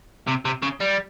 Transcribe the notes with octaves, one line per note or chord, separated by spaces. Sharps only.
C3
C3
C#3
G3